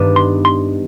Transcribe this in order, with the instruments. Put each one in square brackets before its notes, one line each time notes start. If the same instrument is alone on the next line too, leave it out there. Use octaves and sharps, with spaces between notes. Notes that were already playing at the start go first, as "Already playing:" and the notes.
Already playing: [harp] G2 D#3 B3 D4
[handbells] C6
C6